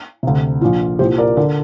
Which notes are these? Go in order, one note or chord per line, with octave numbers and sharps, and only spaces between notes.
D2 C3
A#1 A#2 F4
C2 A#2 G4 C5
A#4 D5
D3 A#4 D5